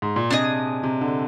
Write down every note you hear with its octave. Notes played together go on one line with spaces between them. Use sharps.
G#2
A#2
C3 D4 G#4 D#5
C3
D3